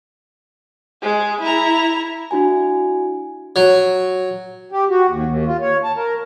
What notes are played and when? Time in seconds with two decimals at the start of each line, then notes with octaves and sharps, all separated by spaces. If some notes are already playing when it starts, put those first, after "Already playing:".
1.02 G#3
1.41 E4 A#5
2.31 D4 E4 F#4 G#5
3.56 F#3
4.72 G4
4.90 F#4
5.08 D#2
5.26 D#2
5.47 F4
5.61 C#5
5.84 A5
5.96 A#4